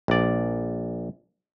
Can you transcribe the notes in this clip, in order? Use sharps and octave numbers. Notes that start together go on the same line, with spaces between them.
A#1 D5